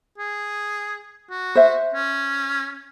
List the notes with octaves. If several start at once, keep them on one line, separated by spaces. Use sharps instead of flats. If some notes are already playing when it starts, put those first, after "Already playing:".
G#4
F#4
C5 E5
C#4